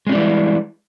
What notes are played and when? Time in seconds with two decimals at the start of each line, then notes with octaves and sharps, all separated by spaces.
0.07 G#3
0.09 C#4
0.12 G3
0.15 E3